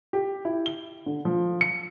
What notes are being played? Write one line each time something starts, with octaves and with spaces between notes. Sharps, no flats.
G4
E4
G7
D3
F3
C#7